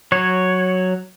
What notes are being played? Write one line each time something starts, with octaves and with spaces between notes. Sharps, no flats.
F#3 C#5